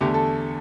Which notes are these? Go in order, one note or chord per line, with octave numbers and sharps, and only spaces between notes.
E2 D3 A3 G4
A4